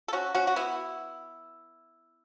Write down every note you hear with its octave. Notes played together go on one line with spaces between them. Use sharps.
A4
C#4 F#4
C#4 F#4
F#4
B3 E4